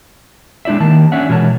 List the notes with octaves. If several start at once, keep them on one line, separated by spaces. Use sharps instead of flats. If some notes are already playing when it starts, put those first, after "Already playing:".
G#3 D4 E4 D5 E5
D#3 A#3 A5
C#4 D4 E5 F#5
B2 E3 G#3 A#4 C#5 A5